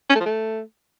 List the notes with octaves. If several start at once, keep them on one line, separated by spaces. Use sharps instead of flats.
C#4
A3
F3
A3